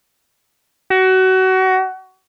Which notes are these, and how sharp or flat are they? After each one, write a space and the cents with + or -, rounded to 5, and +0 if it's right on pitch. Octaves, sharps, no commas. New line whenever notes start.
F#4 +25